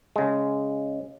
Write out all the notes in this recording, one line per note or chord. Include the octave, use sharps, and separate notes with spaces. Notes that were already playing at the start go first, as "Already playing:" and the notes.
C#3 G#3